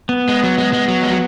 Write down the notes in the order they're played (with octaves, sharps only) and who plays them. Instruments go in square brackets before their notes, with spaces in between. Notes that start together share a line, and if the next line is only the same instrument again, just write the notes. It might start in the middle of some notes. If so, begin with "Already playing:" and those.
[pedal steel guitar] B3
[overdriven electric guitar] G#3
F#3
G#3
G#3
F#3
G#3
F#3